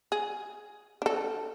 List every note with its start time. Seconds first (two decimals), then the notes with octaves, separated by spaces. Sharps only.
0.12 G#4
1.02 D4 A4